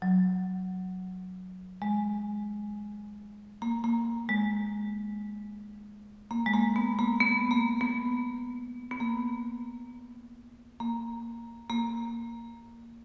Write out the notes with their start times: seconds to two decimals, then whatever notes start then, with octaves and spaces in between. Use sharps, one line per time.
0.02 F#3
1.82 G#3
3.62 A#3
3.84 A#3
4.29 G#3
6.31 A#3
6.46 G#3
6.54 A#3
6.76 B3
6.99 A#3
7.20 B3
7.51 A#3
7.81 B3
8.91 B3
9.00 A#3
10.80 A#3
11.70 A#3